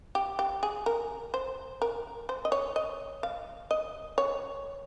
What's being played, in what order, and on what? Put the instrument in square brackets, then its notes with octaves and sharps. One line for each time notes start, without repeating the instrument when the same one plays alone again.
[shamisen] G4
G4
G#4
A#4
C5
A#4
C5
D#5
C#5
D#5
F5
D#5
C#5